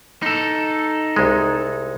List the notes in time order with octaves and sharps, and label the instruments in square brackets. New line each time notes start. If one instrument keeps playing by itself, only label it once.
[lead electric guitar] D#4 A4
[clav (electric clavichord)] C2 G#3